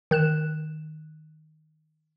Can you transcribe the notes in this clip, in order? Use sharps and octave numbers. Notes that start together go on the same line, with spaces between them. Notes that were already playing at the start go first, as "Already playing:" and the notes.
D#3 F#6 E7